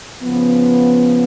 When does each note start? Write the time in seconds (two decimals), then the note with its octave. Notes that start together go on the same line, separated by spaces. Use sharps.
0.22 C#3 F3 B3